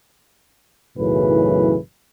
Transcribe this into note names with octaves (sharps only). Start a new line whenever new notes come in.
B1 F#2 A2 C#3 E3 B4